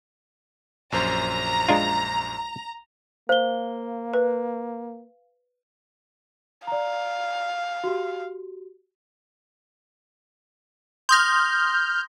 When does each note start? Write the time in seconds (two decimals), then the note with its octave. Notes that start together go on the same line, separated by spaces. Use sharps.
0.92 A#1 F#2 C5 A#5
1.69 G#3 D4 F4
3.29 A#3 C5 F5 G7
4.14 B4
6.67 D5 F5 A#5
7.84 F#4 G4
11.09 C6 D#6 F6 G6 A#6